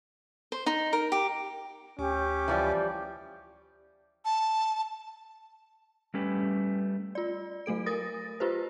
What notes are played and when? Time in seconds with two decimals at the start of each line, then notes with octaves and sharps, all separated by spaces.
0.52 C5
0.66 D#4
0.93 A#4
1.12 G4
1.99 D2 C#4 G4
2.48 E3 F3 G3
4.25 A5
6.14 G3 A3 C#4 G4 B4
7.15 F4 D5
7.66 F#3 A3 A4 D7
7.86 A#4 D#6 A6 A#6
8.40 F4 G4 B4 C5